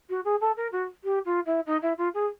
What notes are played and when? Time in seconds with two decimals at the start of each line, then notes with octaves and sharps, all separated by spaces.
0.09 F#4
0.24 G#4
0.40 A4
0.56 A#4
0.71 F#4
1.04 G4
1.25 F4
1.45 E4
1.66 D#4
1.81 E4
1.97 F4
2.14 G#4